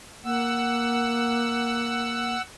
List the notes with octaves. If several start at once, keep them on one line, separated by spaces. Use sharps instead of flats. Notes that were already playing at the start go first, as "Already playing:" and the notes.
A#3 F#5 E6